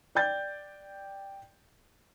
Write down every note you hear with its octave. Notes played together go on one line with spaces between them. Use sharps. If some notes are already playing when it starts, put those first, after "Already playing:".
D5 G5 G6 A6